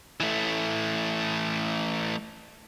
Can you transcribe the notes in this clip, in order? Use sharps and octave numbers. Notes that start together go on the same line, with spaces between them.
E3 A3